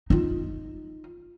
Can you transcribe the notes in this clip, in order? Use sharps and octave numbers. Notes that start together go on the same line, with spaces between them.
D#4 F4